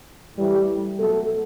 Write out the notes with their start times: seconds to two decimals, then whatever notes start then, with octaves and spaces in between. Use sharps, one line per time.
0.36 A2 E3 G3
0.98 B2 F#3 A3 A4